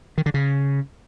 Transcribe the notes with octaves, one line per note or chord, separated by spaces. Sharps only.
D#3
D3
C#3